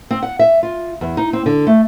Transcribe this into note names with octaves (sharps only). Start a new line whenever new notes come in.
C4
F#5
E5
F4
E2
D#4
C4
D3
A3